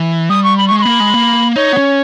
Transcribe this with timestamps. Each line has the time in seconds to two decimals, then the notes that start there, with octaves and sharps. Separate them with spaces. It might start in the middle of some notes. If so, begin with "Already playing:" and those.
Already playing: E3
0.29 G3 D#6
0.44 C#6
0.58 B5
0.68 G#3 C#6
0.78 C#6
0.82 A#3 B5
1.00 G#3
1.14 A#3
1.56 D#4 C#5
1.73 B3
1.77 C#4